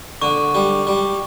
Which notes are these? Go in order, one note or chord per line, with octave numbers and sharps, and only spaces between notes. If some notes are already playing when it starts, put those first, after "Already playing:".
D3 C#6
G3
G3